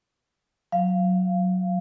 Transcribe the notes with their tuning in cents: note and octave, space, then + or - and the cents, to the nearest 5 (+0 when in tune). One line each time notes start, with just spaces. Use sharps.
F#3 +0 F5 -20